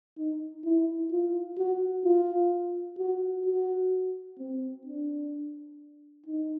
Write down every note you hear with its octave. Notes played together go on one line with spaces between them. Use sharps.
D#4
E4
F4
F#4
F4
F#4
F#4
C4
D4
D#4